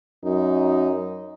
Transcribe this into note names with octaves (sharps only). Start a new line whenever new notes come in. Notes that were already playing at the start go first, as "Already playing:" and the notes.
F#2 D#4